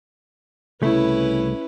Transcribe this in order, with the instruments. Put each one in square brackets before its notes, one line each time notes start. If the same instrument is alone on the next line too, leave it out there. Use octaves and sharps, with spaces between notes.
[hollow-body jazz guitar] C2 C#3 A3 [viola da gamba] C#4 E4 B4